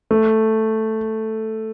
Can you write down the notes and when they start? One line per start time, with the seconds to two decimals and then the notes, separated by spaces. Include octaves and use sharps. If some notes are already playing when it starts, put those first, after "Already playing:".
0.11 A3